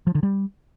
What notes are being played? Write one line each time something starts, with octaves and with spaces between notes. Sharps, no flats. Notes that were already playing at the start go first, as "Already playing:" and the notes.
F3
D3
G3